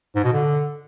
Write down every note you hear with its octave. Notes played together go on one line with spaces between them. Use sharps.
G#2
B2
D3